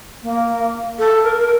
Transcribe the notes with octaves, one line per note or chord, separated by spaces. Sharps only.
A#3
A4
A#4
A#4